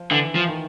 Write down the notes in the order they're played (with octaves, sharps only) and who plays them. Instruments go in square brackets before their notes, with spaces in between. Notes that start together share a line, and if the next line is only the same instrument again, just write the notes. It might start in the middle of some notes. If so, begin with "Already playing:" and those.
Already playing: [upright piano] F3
[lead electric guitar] D3 [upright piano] E3
[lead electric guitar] F3
[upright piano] D#3